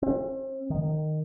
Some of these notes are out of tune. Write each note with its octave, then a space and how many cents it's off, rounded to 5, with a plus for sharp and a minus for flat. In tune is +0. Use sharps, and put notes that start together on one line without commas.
C4 +40
D#3 -15